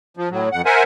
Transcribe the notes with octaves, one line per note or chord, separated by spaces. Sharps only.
F3
A2 F#3
F2 F#5
A#4 C5 E5 F#5 G#5